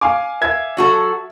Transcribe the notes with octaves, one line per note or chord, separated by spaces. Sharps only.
F5 G#5 D6
E5 G#6
F#3 F#4 A4